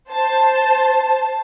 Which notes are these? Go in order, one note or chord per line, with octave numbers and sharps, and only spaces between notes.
C5 A5